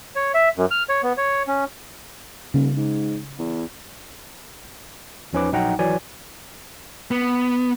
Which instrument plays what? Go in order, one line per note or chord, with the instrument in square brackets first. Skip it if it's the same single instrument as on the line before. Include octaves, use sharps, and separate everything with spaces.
[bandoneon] C#5
E5
F#2
F6
C#5
B3
C#5
C#4
[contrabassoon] D#1 [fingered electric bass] C#3
[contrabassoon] G#2
E2
[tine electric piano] E2 F3 C#4 D#4 B4 D6
A#1 F#3 D#4 F#5 G5 A#5
G#1 E3 F#3 D5 G#5
[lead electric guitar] B3